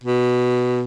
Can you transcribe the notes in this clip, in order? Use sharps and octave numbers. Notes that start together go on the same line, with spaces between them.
B2